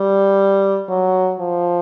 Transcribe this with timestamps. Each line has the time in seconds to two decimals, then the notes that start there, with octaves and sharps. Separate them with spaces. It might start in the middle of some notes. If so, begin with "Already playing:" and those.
Already playing: G3
0.89 F#3
1.40 F3